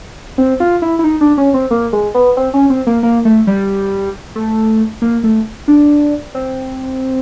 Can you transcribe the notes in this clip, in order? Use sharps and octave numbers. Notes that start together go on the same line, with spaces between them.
C4
F4
E4
E4
D#4
D4
C#4
C4
A#3
G#3
B3
C4
C#4
C4
A#3
A#3
A3
G3
A3
A#3
A3
D4
C4